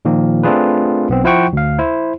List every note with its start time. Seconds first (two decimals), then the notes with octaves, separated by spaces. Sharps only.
0.05 A#2 D#3 F3 A#3
0.43 A3 C4 D4 F4 G#4 B4
1.09 B1 B3 C4
1.24 F3 E4 C5 F#5 G5 C#6
1.53 D2 F5
1.79 E4 C5